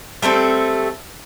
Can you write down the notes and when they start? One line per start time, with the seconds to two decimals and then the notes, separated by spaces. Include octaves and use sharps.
0.22 G3 A3 C4 A4